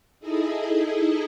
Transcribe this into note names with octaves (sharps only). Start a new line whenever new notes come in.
D#4 E4 G#4 A4 D#5